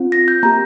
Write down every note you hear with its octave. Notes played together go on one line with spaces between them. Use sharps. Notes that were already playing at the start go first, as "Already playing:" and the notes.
Already playing: C4 F4
A#6
G6
A#3 G4 A#5